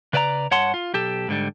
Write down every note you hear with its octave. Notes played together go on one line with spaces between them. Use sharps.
C#3 B4 D5 E5 A#5
G2 C#5 F#5 A5 C6
F4
B1 G4 A4
G#2 D3 G3